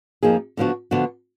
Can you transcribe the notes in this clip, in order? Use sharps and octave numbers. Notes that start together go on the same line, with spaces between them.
F2 F3 A#3 D#4 G#4
D3 F3 B3 D4 F#4
D3 F3 B3 D4 F#4